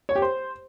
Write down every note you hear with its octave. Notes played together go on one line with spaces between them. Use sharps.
C#5
G4
C5